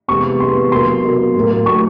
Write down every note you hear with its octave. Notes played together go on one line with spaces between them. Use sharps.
C3 E3 G#3 B3 C#6
C3 E3 G#3 B3 C6
B2 F#3 A#3 C6
B2 F#3 A#3
A2 F#3 A#3
A2 F#3 A#3 C#6